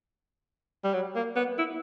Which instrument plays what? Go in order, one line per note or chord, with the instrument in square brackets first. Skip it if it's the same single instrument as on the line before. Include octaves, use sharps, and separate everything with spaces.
[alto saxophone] G3
F#3
A#3
B3
E4